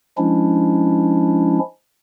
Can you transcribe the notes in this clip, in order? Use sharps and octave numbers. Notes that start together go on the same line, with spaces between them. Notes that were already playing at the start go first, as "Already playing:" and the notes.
F3 G#3 C#4 D4 E4